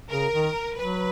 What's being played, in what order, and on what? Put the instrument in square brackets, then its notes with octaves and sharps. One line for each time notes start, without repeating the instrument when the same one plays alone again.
[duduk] C#3 [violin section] A#4
[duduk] D#3
[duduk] F#3 [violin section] B4